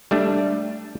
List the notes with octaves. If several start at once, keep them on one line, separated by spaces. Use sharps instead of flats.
G3 A3 D4